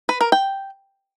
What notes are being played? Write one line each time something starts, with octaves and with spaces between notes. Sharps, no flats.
B4
A#4
G5